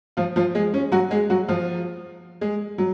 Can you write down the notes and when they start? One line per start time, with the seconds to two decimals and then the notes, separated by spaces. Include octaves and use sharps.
0.17 F3 F4
0.36 F3 F4
0.55 G#3 G#4
0.74 C#4
0.92 F#3 F#4
1.11 G#3 G#4
1.30 F#3 F#4
1.48 F3 F4
2.41 G#3 G#4
2.78 F#3